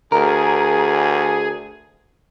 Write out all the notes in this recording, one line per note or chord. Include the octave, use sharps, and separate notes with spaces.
D2 G#4 A#4